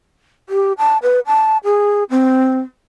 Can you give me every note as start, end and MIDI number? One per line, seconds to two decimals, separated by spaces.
0.49 0.73 67
0.78 0.98 81
1.03 1.20 71
1.27 1.58 81
1.64 2.04 68
2.10 2.60 60